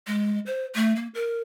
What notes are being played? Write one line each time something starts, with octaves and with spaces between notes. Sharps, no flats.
G#3
C5
A3
A#3
A#4